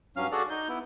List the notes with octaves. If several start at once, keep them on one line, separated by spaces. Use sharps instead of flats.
G2 F#3 C#4 F5 F6
D4 F#4 G#4 A4 D5
D#4 G6
B3 E4